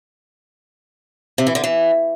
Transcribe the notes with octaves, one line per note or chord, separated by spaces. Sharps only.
C3
E3
D3
E3